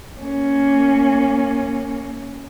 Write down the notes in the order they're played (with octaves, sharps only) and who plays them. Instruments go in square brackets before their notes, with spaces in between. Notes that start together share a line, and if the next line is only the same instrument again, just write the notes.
[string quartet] A#3 C#4